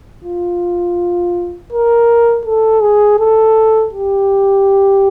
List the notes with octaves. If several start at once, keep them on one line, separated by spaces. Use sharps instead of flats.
F4
A#4
A4
G#4
A4
G4